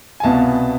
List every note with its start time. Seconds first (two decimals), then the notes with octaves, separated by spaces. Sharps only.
0.20 G#5
0.23 C2 B2 B3 F5 A5